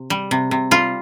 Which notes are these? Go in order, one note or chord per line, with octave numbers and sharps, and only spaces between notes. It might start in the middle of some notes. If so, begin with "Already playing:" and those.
Already playing: C3
G3
C3
C3
G3 F4